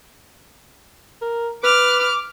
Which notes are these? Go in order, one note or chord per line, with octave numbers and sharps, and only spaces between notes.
A#4
B4 D6 F6